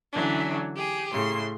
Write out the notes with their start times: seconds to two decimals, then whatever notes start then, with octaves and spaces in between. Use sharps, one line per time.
0.13 D3 E3 F#3 C#4 D4
0.76 G4 G#4
1.12 A2 C#3 C6